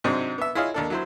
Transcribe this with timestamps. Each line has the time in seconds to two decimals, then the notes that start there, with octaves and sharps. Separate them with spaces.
0.04 G#2 C3 F#3 G#3 C4 D4
0.38 B3 E5
0.55 E4 F4 G#4 C#5 D#5 F5
0.74 D#2 D4 A4
0.90 F#3 E4 C5